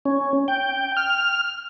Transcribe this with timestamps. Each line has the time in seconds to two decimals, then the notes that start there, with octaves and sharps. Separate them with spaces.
0.05 C#4
0.48 G5
0.97 F6